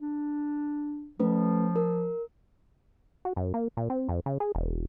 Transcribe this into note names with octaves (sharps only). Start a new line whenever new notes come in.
D4
F3 A3 C#4 B4
A#4
F#4
F#2
A#3
A#2
C4
F2
C#3
G#4
E1